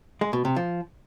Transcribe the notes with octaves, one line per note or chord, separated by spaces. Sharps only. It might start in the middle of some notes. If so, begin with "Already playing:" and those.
G#3
B2
C3
F3